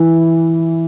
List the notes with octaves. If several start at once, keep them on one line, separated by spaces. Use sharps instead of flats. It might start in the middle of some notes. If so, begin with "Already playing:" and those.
Already playing: E3